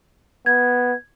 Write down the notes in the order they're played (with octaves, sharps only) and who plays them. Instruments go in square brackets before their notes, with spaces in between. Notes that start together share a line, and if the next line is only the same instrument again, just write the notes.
[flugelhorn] B3 [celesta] G#6